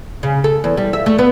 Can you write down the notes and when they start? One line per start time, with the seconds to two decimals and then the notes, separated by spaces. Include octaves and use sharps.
0.23 C#3
0.44 A4
0.64 E2
0.77 G3
0.93 E5
1.06 A3
1.19 B3